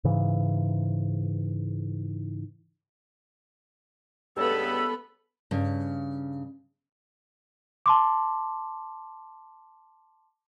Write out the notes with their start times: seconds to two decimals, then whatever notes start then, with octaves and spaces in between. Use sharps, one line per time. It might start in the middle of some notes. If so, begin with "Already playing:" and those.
0.04 G#2 C#3 E3
4.37 C#2 G2 B3 A4 B5 E6
5.51 G2 C#3
7.86 A5 C6 D6